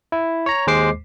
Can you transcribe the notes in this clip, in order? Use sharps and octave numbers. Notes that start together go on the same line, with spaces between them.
E4
C#5 A#5
D#2 G#3 C5 D6 C7